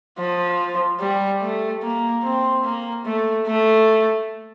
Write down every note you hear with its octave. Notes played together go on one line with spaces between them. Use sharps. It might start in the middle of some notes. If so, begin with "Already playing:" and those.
F3
G3
A3
A#3
C4
A#3
A3
A3